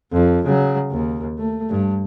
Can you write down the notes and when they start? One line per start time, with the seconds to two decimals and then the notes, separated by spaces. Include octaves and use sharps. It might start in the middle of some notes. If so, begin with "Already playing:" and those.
0.13 F2
0.46 C#3 F#3
0.91 D#2
1.39 A3
1.69 G2